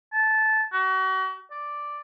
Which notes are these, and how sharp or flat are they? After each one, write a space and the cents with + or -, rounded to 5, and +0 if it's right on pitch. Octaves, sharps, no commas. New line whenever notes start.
A5 -15
F#4 +35
D5 +0